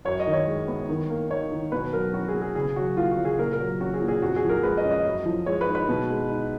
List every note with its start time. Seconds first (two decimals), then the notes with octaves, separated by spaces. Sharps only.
0.05 F#2 C#5
0.20 D#5
0.27 D#3
0.33 C#5
0.47 G#3
0.68 B3
0.89 D#3
1.09 A#3
1.30 D#4 C#5
1.52 D#3
1.72 B2 B4
1.92 F#3 A#4
2.13 C#4 F#4
2.28 G#4
2.35 B2
2.42 G#4
2.55 C#3 G#4
2.76 F#3 F#4
2.97 A#3 F4
3.11 F#4
3.18 C#3
3.25 G#4
3.39 A#2 A#4
3.53 A#4
3.59 F#3
3.80 C#4 F#4
3.94 G#4
4.01 A#2
4.08 G#4
4.21 F2 F#4
4.36 G#4
4.43 F3
4.49 A#4
4.63 G#3 B4
4.77 D#5
4.85 C#4
4.91 D#5
5.05 F#2
5.26 F3
5.46 G#3 C#5
5.61 B4
5.68 D#4
5.75 B4
5.89 B2
6.10 G#3
6.30 D#4